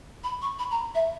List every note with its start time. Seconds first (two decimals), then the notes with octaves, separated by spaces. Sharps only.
0.24 B5
0.42 C#6
0.59 B5
0.71 A#5
0.95 E5